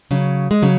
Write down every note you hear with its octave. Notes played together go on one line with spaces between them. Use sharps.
C#3 F#3
G#3
C#3 F#3